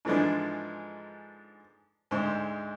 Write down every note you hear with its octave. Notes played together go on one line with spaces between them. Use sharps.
G#2 D3 E3 F3 G#3 D4
D2 G#2 G#3 C5